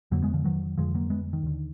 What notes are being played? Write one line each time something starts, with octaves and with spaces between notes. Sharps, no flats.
F2 D3 F#3 A#3
G#3 B3
D3 F3
D#3 F#3
F2 D3 F3 G#3
F#3 A#3
G#3 B3
D#3
D#2 D3